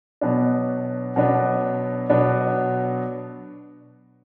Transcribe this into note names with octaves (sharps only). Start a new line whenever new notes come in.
B2 F#3 B3 D4
B2 F#3 B3 D4
B2 F#3 B3 D4